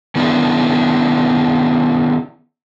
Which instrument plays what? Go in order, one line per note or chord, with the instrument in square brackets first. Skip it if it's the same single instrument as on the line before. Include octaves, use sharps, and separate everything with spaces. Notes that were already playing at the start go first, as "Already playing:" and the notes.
[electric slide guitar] D#3 B3 C#4 D4 E4